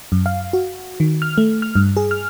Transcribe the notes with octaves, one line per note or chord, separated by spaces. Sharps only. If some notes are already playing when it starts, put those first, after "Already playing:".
F#2
F5
F#4
D#3
F6
A3
F6
G2
G#4
F6